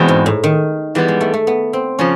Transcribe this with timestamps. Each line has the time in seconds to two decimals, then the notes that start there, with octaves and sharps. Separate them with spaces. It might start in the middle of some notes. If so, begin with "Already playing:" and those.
Already playing: E2 B2 G#3 C4
0.08 G#2
0.26 A2
0.44 D#3
0.95 E3 G3 G#3 B3
1.08 G#3
1.21 A3
1.34 A3
1.47 B3
1.73 C4
1.99 C#3 F3 C#4